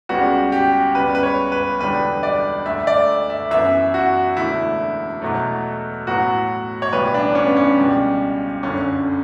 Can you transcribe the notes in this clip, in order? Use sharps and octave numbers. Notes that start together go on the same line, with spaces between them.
C#2 C#3 G3 B3 F#4
G4
C#2 C#3 G3 B3 B4
B4
C#5
B4
E1 E2 D3 G3 B4
D5
D2 D3 A3 E5
D5
E5
F#2 E3 B3 E5
F#4
E1 E2 D3 A3 E4
E2 B2 F#3 A3
A1 A2 F#3 B3 F#4
C#5
B1 A2 E3 G3 B3 B4
D4
C#4
B3
C#4
C#2 B2 G3 B3
G1 F#2 D3 C#4